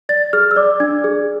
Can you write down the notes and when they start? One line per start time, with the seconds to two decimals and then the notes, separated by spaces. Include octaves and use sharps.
0.09 D5 A6
0.33 G#4 F6
0.51 E6
0.56 D5 D6
0.80 D4 G#6
1.04 G#4